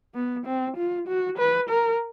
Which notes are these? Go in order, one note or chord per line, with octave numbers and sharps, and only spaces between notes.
B3
C4
F4
F#4
B4
A#4